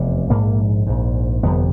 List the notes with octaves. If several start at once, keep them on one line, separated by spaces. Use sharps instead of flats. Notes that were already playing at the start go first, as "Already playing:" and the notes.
Already playing: F1 E2 C3 B3
A#1 G#2 A#3
A#1 G#2
G1 F2 C3 B3